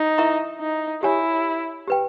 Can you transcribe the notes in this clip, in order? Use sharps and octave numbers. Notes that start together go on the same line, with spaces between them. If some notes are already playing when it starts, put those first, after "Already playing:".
Already playing: D#4
E4 A#4 E5 A#5 C#6
D#4
E4 G4 C#5 G#5
G4 B4 G5